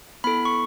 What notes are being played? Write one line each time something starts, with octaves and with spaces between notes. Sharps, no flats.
B3 E4 A4 B5
C#6